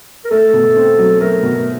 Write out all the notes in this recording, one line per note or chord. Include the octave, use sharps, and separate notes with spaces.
A#4
A3 A4
B2
C4
F#3
A3 A#4
B2